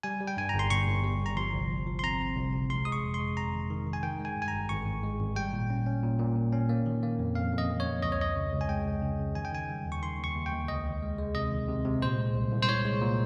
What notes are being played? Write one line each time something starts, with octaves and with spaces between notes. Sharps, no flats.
G3 G#5
G3
G5
G2 G#5
G1 A#5
C6
G1 C#6
G1
G3
G1
A#5
F3 C6
C2
F3
F3
C6
C4 A#5
C4
C2
C3
G#3 C6
G#3 D#6
C#6
F2
C6
G#3
F2 A#5
D#3
D#3
D#3
G#5
D#3 G5
G#3
G#5
G2
G#5
A#5
G#1
G#1 C#6
G#1
G#3
G#1
G3 G5
A#2
C#4
C#4
A#2
A#2
A#2
C#4
A#3
D#3
A#3
F2
F2 F5
F2
D#5
F2
C#5
F2
C#2 D#5
C#5
C#2 D#5
C#3
C#2
G#5
G#3 G5
C#2
C#3
C#3
D#3 G#5
G5
D#3 G#5
G3
D#2
C#6
D#3 C6
D#2
C#6
D#2
G5
D#2
C#2 D#5
C#2
G#3
G#3
C3 D#5
D#3
C3
C3
A#2 C5
G#3
C2
C2
C5
C2 C#5
G#3
A#2